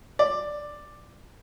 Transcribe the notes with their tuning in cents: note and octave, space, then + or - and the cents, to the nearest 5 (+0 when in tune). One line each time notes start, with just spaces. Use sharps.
D5 +5